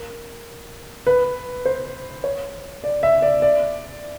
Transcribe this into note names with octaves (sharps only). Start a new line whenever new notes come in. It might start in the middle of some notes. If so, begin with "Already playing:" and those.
Already playing: A#4
B4
C5
C#5
D5
E5
D5
D5